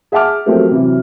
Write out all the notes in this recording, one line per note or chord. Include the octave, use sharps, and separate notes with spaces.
G#4 E5 F#5 A5 D6 F6
F3 F#3 A3 C4 G4 A#4
C3 E3 F#3